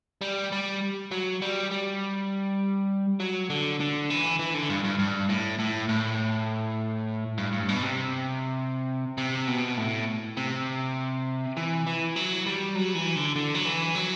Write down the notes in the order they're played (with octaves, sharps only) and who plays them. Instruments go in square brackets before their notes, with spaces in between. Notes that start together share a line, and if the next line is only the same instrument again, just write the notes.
[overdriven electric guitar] G3
G3
F#3
G3
G3
F#3
D3
D3
E3
E3
D3
G2
G2
G2
A2
A2
A2
G2
G2
B2
C3
C3
B2
A2
C3
E3
E3
F#3
G3
F#3
E3
D3
D3
F#3
E3
F#3